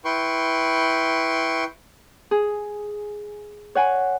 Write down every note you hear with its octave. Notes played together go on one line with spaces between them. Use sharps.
E4 B4 G5 C6 C#6
G#4
C#5 F#5 G#5